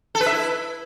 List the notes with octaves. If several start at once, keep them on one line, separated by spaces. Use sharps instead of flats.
A4
B4
E5
E4